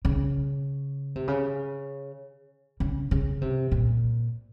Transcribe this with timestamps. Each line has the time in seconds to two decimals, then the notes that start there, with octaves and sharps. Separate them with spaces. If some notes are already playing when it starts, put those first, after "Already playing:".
0.05 C#3
1.15 C3
1.28 C#3
2.80 C#3
3.11 C#3
3.41 C3
3.72 A#2